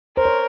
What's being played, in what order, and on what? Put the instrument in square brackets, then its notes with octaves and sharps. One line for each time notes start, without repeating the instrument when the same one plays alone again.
[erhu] A#4 [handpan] C5
[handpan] C#5